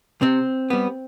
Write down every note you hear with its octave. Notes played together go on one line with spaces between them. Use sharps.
C3 C4
G3 B3